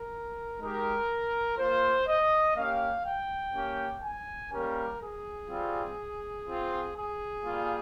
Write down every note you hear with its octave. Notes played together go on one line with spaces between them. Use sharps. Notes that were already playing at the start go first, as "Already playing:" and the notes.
Already playing: A#4
G#3 D#4 G4 A#4
A#3 F4 C5
D#5
A#3 C#4 G4 F5
G5
A#3 C#4 G4
G#5
G3 A#3 C#4 G4 A#4
G#4
G3 C4 F4
C4 F4
G#4
G3 A#3 F4